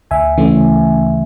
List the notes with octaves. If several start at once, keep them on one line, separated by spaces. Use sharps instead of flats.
D2 E5 G#5
C#3 E3 A3 C#4